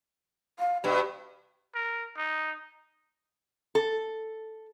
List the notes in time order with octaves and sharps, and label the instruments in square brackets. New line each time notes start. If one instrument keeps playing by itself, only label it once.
[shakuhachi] F5
[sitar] G2 B2 [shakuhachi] G4
[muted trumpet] A#4
D#4
[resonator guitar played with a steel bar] A4